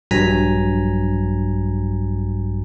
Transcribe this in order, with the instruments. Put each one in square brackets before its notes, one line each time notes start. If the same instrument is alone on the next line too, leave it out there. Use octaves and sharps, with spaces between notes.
[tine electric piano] A#1 G2 F#3 G#5 A#5 B6